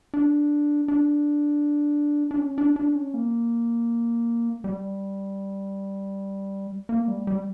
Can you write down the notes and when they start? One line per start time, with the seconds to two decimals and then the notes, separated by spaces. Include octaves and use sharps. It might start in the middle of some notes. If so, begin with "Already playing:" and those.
0.14 D4
0.88 D4
2.31 D4
2.39 C#4
2.58 D4
2.76 D4
2.95 C#4
3.14 A#3
4.64 G3
6.89 A#3
7.08 G3
7.27 G3